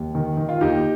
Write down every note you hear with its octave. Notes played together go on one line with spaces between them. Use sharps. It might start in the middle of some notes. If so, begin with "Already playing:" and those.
Already playing: D#2
D#3
D#3
F4
D#2 D#4 G4